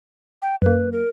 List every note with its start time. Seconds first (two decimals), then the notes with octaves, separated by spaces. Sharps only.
0.42 G5
0.62 F#2 A#3 B4
0.92 A#4